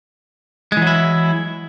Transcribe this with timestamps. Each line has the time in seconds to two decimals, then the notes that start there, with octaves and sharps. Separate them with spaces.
0.72 G#3
0.77 E3
0.82 F#3
0.87 E4